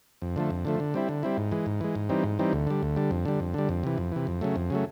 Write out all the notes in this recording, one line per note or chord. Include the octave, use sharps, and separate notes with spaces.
F2
D3 F3 A3
F2
D3 F3 A3
D3
G3 C4 E4
D3
G3 C4 E4
G#2
E3 G#3
G#2
E3 G#3
G#2
E3 G3 C4 D#4
G#2
E3 G3 C4 D#4
D2
D3 G3
D2
D3 G3
F2
D3 G3
F2
D3 G3
F2
C3 E3
F2
C3 E3
F2
C#3 F#3 A3
F2
C#3 F#3 A3